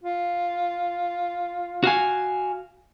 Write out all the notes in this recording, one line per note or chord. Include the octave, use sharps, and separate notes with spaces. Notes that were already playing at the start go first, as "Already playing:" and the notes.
F4
F#4 F5 G#5